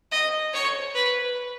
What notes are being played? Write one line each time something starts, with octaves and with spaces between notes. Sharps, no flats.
D#5
C#5
B4